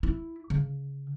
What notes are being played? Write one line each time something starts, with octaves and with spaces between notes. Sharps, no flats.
E4
C#3